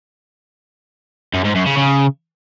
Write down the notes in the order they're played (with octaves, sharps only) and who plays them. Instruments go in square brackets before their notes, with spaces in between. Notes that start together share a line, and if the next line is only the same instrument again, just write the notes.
[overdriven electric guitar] F#2
G#2
F#2
C#3
C#3